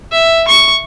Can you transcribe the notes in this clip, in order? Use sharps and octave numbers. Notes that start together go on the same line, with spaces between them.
E5
C#6